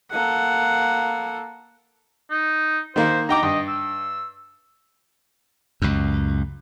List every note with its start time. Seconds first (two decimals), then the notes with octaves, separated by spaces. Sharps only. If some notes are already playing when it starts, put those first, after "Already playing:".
0.12 A#3 A4 F#5
2.30 D#4
2.96 D#3 A#3 C5
3.29 D#4 G5 A#5 D6
3.43 G2 D#5 G5
3.68 E6
5.82 C#2 F#2